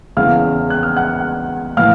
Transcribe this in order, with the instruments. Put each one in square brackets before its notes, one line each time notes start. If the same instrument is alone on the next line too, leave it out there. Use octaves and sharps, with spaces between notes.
[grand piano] E2 C#3 E3 F5 F6
F#6
F6
F#5 F#6
A2 E3 F5 F6